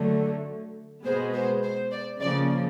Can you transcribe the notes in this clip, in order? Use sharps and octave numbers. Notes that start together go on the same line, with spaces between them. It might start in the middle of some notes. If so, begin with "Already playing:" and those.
Already playing: D3 F#3 A3
B2 G#3 B3 C5
C5
C5
D5
C#3 F3 A#3 D5